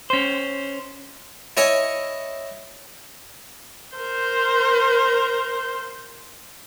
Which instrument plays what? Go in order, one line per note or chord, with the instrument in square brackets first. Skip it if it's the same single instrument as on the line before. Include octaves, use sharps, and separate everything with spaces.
[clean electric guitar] C#4 C5
[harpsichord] E4 C#5 D#5 G#5
[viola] A#4 C5